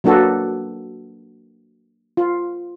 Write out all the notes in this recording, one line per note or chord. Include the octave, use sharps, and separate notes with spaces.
F#3 A#3 D4 F#4 A4 B4
F4